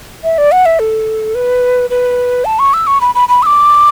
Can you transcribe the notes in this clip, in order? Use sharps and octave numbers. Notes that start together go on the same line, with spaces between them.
E5
D5
F#5
E5
A4
B4
B4
A5
C#6
E6
C#6
B5
B5
B5
E6
D6